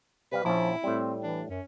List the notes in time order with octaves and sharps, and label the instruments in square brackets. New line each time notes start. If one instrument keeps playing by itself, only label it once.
[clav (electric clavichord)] C3 G3 F5 [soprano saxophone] B4
[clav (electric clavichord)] A#1 C#4 [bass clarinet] F3 [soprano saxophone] E4
[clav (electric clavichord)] A2 G3 [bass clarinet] C4
[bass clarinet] E3 [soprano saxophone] D4
[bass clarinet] F#2 [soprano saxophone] C#4